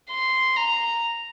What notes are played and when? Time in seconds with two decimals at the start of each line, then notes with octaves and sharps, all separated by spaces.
0.10 C6
0.56 A#5